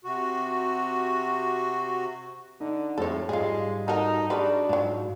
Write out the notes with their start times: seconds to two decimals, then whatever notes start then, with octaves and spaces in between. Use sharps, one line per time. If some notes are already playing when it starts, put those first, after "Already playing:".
0.04 C3 F#4
2.61 D3 D#4
2.98 F2 A2 F3 G#3 A4 C#5
3.29 G#2 G3 G#3 F4 G#4
3.88 D#4 F#4 A4 A#4
4.30 G3 G#3 D4 F#4 B4
4.69 G#2 F3 F#3